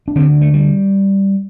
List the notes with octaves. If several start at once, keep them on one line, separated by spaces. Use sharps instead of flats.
D4
D2 D3 C4
A3
G3